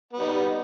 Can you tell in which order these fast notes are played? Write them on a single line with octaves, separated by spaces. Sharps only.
B3 G3 D#4